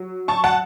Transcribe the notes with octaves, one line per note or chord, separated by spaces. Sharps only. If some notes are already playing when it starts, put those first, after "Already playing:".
Already playing: F#3
A5 C#6
F#5 A5